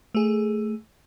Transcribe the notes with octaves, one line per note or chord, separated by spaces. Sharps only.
A3 G#4